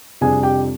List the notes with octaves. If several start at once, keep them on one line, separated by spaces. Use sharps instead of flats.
F2 C3 G3 D4 G#4 G#5
G4 G5